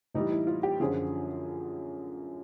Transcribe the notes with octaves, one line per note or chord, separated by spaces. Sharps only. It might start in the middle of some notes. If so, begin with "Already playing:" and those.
A2 E3 G3 D#4
E4
F4
G4
F#2 D3 F3 G#4